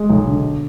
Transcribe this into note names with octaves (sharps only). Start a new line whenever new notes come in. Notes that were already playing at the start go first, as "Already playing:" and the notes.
Already playing: G#3
B1
D3